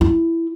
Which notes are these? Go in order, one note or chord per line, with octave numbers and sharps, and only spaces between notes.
E4